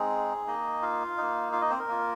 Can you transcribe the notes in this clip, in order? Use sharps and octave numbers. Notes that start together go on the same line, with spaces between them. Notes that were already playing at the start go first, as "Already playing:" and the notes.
Already playing: G#3 C4 D#4 G#4
A#3 D#4 D#5
F4 F5
A#3 D#4
F4 F5
D#4 D#5
C4 C5
A#4
A#3 F4